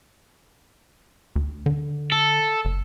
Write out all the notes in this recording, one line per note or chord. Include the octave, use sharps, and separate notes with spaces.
D2
D3
A4
F#1